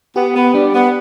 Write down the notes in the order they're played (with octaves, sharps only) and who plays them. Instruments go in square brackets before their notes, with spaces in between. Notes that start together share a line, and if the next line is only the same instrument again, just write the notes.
[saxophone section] B3 [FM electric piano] G4
[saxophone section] B3
[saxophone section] G3 [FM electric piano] D4
[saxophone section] B3